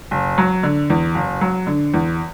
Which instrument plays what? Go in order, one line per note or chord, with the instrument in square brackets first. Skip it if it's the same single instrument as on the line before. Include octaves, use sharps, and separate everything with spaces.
[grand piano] F#1
F#3
D3
E2
F#1
F#3
D3
E2